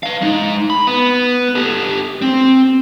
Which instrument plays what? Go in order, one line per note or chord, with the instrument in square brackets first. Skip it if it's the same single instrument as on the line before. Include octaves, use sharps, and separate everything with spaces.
[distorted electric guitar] B4 F5
G#3 D#4
B5
B3
G4 A4
C4